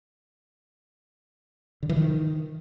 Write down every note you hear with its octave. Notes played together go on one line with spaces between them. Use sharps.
D3
E3
D#3